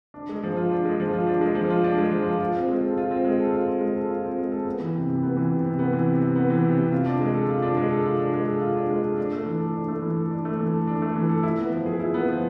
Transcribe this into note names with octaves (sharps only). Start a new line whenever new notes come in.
D4
G#3
F3
F4
D4
G#3
F3
F4
D4
G#3
F3
F4
D4
G#3
F3
F4
F4
C4
G#3
A4
F4
C4
G#3
A4
F4
C4
G#3
A4
F4
C4
G#3
A4
B3
E3
C3
C3
B3
E3
C3
C3
B3
E3
C3
C3
B3
E3
C3
C3
F4
D4
G#3
A4
F4
D4
G#3
A4
F4
D4
G#3
A4
F4
D4
G#3
A4
D4
A3
E3
A4
D4
A3
E3
A4
D4
A3
E3
A4
D4
A3
E3
A4
E4
B3
F3
G#4
E4
B3
F3